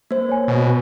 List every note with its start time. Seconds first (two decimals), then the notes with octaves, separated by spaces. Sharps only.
0.11 A#3 C5
0.29 C#5 G#5
0.48 B2